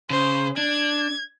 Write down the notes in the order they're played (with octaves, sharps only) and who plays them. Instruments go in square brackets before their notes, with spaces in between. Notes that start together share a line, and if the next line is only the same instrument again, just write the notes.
[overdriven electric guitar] C#3 [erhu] C5
[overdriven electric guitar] D4 [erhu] G#6